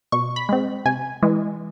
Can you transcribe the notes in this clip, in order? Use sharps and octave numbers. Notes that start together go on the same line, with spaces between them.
B2 C#6
B5
G#3 C4
C3 G#5
E3 G#3